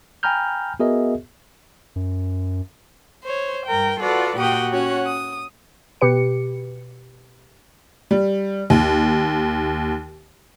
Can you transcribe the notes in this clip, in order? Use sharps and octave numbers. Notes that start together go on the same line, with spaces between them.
G5 G#5 A#5 B5 F6 G6
B3 F#4 G#4 A#4 D#5 E5
F#2
C5 C#5
G2 A#4 G5
F4 F#4 A4 B4 D5 F#5
A#2 F#4 G4 F#5 G5 D#6
C#4 F#4 C#5 F#5
D#6
B2 G4 B4 C#7
G3
D#2